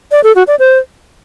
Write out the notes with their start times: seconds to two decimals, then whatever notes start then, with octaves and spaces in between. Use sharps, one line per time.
0.12 D5
0.24 A4
0.36 F#4
0.47 D5
0.59 C5